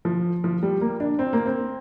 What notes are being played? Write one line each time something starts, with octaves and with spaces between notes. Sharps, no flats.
F3
F3
G3
A#3
D4
C4
A#3
C4